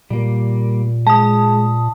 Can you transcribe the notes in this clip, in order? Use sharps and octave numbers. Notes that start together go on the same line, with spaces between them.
A#2 G3 A#3
G#3 A5 D#6